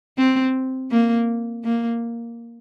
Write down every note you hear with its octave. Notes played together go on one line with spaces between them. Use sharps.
C4
A#3
A#3